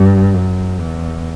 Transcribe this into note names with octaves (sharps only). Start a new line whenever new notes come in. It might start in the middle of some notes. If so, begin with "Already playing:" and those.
Already playing: G2
F#2
E2